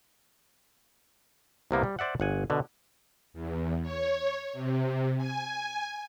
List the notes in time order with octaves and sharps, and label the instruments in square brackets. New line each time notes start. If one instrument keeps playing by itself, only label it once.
[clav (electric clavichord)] C2 C3 A#3 B3
G3
C5 D5 E5 F#5
G1 F#5 G#5
B2 D3
[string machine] E2
C#5
C3
G#5